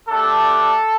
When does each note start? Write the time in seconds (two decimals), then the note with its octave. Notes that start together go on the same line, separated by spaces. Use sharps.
0.09 A3 D4 G4 A4